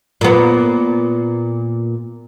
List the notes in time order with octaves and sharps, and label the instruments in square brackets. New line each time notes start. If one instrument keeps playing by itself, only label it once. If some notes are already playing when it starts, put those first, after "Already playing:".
[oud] A#2 B3